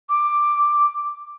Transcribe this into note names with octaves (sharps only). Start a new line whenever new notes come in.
D6